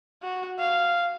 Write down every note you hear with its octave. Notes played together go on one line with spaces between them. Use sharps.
F#4
F5